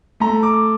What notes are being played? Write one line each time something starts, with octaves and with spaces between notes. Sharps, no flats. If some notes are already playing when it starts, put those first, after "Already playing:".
A3 A#5
D6